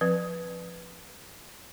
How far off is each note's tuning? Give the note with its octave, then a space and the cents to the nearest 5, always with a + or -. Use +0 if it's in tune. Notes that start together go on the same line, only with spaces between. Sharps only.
F3 +5 C4 +20 B4 +0